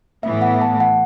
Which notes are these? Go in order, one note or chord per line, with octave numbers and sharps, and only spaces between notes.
A2 E3 B3 E5
F#5
A5
F#5